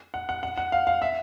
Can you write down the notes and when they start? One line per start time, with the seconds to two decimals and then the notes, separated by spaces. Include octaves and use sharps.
0.14 F#5
0.29 F#5
0.43 F#5
0.57 F#5
0.72 F5
0.87 F5
1.02 E5